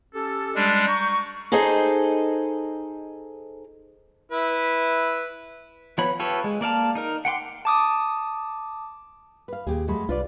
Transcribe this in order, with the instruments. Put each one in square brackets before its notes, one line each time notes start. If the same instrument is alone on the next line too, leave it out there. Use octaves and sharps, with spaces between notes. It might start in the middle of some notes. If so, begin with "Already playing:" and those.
[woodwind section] C#4 G4 A4
[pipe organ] G3 G#3 D4
[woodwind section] A#5 C#6 [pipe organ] G6
[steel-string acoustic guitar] D#4 G#4 A4 C5 D#5
[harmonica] E4 B4
[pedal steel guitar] F3 B3 C#5 B5
F4 G4 A4 B4 C#5
G#3
A#3 D5 F5 A5
D#4 A#4
F#5 G5 C6 D6
[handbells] A5 D6 D#6
[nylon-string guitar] B4 F5
[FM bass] D#2 [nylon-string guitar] A#2 G4 G#4
[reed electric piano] F2 A3 B5 [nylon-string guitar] F#3 G#3
[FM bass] C2 [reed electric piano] D4 B4 D5 [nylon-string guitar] F4